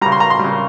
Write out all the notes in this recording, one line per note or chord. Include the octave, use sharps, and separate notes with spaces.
C#3 G3 A#5
C6
A#5
C6
C#3 G3